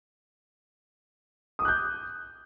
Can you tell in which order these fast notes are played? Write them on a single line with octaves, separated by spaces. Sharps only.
D#6 D6 F#6 G6